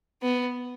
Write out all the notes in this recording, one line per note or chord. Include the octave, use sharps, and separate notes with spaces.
B3